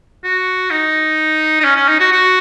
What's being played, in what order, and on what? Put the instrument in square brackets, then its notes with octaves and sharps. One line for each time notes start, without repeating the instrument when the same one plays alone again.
[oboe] F#4
D#4
D#4
C#4
C#4
D#4
F#4
F#4